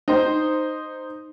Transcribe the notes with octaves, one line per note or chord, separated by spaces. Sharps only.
D#4 C5